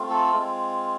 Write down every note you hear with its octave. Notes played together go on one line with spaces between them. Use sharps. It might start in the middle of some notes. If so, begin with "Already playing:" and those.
Already playing: A3 C4 F4
A4
G#3 C4 F4